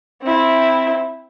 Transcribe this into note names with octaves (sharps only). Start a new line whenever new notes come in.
C4 E4